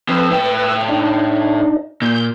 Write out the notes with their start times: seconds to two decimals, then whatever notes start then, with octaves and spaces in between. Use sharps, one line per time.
0.09 F3 C4 B4 E6
0.31 A2 G5
0.88 D4 D#4
2.02 A#2 G6